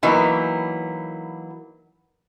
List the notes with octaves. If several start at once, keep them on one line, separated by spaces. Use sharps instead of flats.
E3 F#3 A#3 B3 D#4